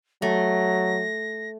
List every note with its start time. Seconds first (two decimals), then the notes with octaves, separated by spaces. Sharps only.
0.22 F#3 A3 A#6